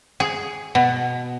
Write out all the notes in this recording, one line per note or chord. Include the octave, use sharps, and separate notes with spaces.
G#4
B2